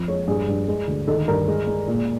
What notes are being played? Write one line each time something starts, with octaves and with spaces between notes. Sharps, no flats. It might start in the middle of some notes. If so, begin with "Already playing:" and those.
Already playing: F2 F3
G#3 C#5
G2 G#4
G2
G#3
D2
D#3 A4
G2 A#4
G#3
G#3
A#2